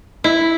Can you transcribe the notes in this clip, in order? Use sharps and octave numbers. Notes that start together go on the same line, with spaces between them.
E4